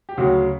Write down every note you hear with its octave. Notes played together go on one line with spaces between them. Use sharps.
G4
D2 C#3 F#3 F#4